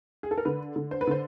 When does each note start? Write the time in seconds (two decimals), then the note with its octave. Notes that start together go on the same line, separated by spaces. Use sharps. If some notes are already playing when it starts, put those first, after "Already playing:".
0.23 G#4
0.31 A4
0.38 A#4
0.45 D3 B4
0.76 D3
0.91 C5
1.01 B4
1.07 D3 C5